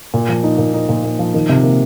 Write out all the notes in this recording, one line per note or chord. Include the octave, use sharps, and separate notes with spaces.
A#2
F3
D#4
A#2
D#4
A#2
A#3
F3
D#3
C3
A#3